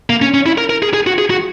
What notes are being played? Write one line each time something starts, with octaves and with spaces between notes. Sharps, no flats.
A#3
C#4
C#4
E4
A#4
A#4
G#4
G#4
F#4
G#4
F#4